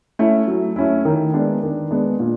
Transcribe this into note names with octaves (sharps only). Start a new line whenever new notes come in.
A3 C#4 E4
F#3
A3 C#4 E4
D#3
G#3 B3 D4
D#3
G#3 B3 D4
A#2